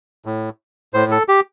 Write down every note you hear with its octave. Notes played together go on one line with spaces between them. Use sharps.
A2
A2 C5
A4
G4